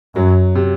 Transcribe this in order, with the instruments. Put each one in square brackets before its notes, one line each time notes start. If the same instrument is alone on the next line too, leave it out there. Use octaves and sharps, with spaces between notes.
[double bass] F#2 [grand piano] F#3
[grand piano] C3